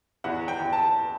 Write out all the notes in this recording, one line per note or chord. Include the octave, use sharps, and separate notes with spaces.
E2 F#5
G5
E2
A5